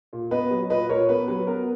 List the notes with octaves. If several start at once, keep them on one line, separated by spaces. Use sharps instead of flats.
A#2
B3 B4 D#5
F#3
A#2 B4 D#5
A#2 A#4 C#5
B3 B4
F#3 B4
B3 A#4